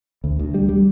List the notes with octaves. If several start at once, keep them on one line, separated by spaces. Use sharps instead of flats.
D2
D2
G3
G3